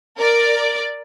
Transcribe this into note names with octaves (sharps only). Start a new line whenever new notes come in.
A#4 D5